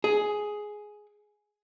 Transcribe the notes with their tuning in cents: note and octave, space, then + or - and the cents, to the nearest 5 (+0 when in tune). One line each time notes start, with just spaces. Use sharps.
G#4 +10